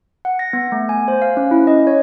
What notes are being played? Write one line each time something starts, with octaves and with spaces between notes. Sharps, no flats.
F#5
A#6
B3
A3
G#5
C5
F5
C#4
E4
D#5
C#5